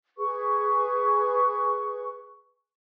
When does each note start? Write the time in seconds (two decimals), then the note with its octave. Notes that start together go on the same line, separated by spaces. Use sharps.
0.18 G#4 B4 C#6